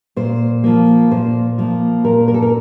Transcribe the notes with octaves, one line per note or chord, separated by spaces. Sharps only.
A#2 C5
F3 A#3
A#2 C5
F3 A#3
A#2 A#4
A#4
A4
A#4